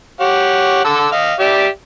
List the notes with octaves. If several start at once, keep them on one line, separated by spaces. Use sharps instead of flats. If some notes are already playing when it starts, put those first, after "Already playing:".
G4 C#5 F#5
D3 A4 E6
D#5 F5
G4 D5 E5